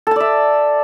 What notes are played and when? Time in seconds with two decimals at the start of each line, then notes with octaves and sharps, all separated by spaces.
0.07 A4
0.11 A5
0.16 D5
0.20 E5